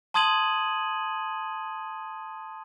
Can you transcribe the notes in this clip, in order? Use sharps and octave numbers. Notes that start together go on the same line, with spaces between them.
A5 C6 D#6 G#6 D#7 F#7